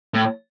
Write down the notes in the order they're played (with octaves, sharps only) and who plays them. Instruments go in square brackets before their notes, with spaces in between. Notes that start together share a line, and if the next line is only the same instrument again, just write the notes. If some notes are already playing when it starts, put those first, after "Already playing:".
[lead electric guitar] A2